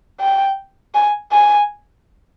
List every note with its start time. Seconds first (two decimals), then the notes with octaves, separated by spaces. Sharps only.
0.20 G5
0.94 G#5
1.32 G#5